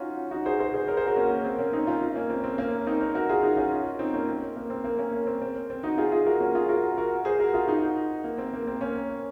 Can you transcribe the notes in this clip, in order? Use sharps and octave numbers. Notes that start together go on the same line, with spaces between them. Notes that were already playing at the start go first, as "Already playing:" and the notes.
Already playing: C#4 D#4 F4 F#4
D#4 F#4
G#4 C5
G#4 C5
G#4 C5
A#4 C#5
G#4 C5
F#4 A#4
A#3 C#4
A#3
C4
A#3 C#4
C4 D#4
C#4 F4
A#3 C#4
C4
C4
A#3 C#4
C4 D#4
A#4 C#5
F#4 A#4
F4 G#4
D#4 F#4
C#4 F4
C4 D#4
A#3 C#4
C4
A#3
C4
A#3
A#3 C#4
A#3
C4
C4
C4
D#4 F#4
F4 G#4
F4 G#4
F#4 A#4
A#3 C#4
F4 G#4
F#4 A#4
F#4 A#4
G#4 C5
F#4 A#4
F4 G#4
D#4 F#4
A#3
C4
A#3
C4
A#3 C#4